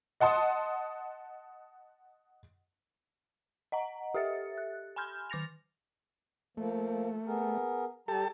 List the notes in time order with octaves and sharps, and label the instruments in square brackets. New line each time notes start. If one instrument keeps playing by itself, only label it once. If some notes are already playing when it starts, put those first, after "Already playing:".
[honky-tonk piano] D#5 F#5 A5 C6 D#6
[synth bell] D#5 F#5 A#5
G4 A4 E5 A6 C#7
F#6
G#5 B5 C6 F6 G6
D#3 D6 A6 A#6 F7
[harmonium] F3 A#3 [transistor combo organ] A3
[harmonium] B3 G#4 A#4
[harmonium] G3 A#5 [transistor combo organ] G4 A4 A5